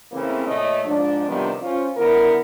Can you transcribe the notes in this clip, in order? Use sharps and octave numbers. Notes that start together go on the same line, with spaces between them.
C#3 E3 A3 A#3 C4
A#2 A3 C#5 D#5
G#2 F3 D4
C3 D#3 F3 G3 B3 D4
C#4 F4 C5
D3 B3 E4 A#4